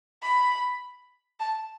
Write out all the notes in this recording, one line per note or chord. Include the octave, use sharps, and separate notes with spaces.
B5
A5